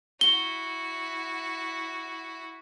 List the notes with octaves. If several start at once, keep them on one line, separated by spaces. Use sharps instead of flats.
E4 F#4 G7